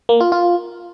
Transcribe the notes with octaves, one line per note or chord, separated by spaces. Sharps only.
A#3
F4
F4